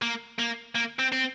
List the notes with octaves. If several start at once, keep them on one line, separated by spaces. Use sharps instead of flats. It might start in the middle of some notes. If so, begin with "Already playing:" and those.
A#3
A#3
A#3
C4
C4